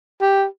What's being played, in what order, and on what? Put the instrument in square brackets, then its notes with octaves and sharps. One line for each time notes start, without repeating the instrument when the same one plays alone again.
[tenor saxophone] G4